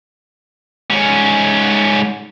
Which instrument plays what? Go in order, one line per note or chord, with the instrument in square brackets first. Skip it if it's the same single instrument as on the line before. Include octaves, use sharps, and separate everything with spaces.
[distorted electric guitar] G#2 C#4